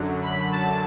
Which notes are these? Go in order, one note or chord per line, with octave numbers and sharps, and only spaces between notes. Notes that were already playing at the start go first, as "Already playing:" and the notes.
Already playing: F#2 D3 F#3
B5
A5